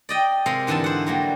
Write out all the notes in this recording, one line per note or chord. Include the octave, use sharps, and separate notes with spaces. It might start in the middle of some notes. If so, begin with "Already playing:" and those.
D5 D#5 G5
C3 G#3 A#4 F5
G#2 D3 E3 E4 A5
C5 F#5
F#3 G3 A#3